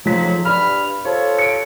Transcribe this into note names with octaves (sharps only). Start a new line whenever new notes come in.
F2 G#2 F3 F#3 B6
G2 B5 F6
F4 A4 C5 C#5
C#7 D7